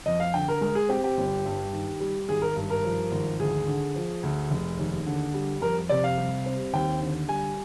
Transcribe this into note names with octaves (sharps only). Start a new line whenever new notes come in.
F2 D#5
F5
D3 G5
A#4
G#3 A#4
G#4
C4 G4
G4
G1
G2
D#3
G3
G#1 G#4
A#4
G2
A#4
F3
G#1
D2 G#4
D3
F3
D2
F1
D#2
D3
G3
F2 A#4
C3 D5
F5
G3
C4
D#2 G5
D3
G3 G#5